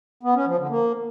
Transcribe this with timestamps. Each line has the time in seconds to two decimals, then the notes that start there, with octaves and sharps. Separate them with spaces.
0.23 B3
0.35 C#4
0.46 F3
0.58 D3
0.69 A#3